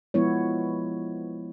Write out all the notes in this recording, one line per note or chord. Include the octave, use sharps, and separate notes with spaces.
F3 G#3 B3 E4 C#5